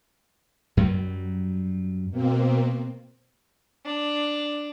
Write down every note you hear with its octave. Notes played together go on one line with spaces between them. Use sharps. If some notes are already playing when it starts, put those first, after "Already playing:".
F#2 F#3 G3
B2 A#3 C4
D4